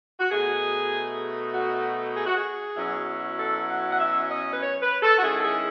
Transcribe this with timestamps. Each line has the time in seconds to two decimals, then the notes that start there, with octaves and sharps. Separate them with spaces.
0.20 F#4
0.31 B2 A3 D#4 G#4
1.53 F#4
2.16 G#4
2.26 F#4
2.37 G#4
2.77 B2 F#3 C#4 E4
3.39 A4
3.69 F#5
3.92 F#5
4.00 E5
4.30 D#5
4.52 B4
4.61 C#5
4.82 B4
5.03 A4
5.18 F#4
5.23 D#3 G#3 C#4 E4 G#4
5.39 A4
5.43 G#4